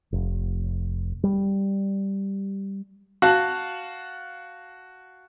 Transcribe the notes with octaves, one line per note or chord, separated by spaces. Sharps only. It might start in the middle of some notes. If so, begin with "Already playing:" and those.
F1
G3
F#4 F5 F#5 A5